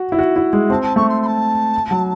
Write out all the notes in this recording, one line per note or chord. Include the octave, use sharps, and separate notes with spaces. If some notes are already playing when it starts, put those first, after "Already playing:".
Already playing: F#4
E4
F#4
E4
G#3
C4 A5
A5
A3 C#6
C6
C6
A5
F#3